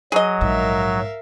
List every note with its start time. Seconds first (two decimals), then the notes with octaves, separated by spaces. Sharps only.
0.12 F#3 G#4 D#5
0.41 A#1 G#2 A#4 E5 F5